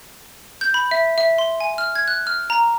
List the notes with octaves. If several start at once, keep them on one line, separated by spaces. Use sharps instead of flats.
G6
B5
E5
E5
C6
G#5
F6
G#6
F#6
F6
A#5